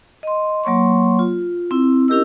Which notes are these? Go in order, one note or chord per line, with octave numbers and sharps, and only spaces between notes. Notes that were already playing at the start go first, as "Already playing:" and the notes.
D#5 C6
F#3 A#3 C#5 C6 C#6
F4
C4 E4
C#4 E4 G4 A#4 D#5 E6